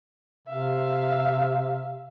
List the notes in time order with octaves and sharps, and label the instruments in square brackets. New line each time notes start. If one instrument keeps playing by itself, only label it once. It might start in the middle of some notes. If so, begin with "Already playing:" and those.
[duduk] C3 [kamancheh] E5 F5